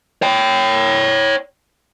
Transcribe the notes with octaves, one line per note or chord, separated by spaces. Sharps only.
C#5 G5